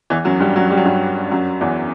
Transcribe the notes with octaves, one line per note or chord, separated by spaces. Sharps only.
E2 E3
F#2 F#3
G2 G3
F#2 F#3
G3
F#3
G2 G3
F#2 F#3
E2 E3